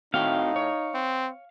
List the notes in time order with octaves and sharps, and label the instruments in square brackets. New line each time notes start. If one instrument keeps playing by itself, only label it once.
[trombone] A2 [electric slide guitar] C4 F#4 G5 [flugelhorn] D#4 [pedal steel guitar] F5
[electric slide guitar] C#5
[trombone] C4